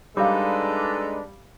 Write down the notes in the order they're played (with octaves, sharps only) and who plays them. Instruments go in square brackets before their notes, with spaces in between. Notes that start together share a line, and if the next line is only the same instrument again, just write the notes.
[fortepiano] G3 [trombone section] G#3 D4 [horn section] D#4 A4 B4 [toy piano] F5 D6